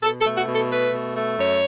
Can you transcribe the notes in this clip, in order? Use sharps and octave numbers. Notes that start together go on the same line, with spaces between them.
B2 A4
A4
A3
F#4
B2
A4
A3 B4
B2
A3
F#2 C#5